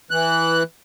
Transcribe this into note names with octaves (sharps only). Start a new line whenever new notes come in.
E3 F#6